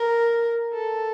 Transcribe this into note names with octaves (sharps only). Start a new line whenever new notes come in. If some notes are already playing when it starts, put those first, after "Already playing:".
Already playing: A#4
A4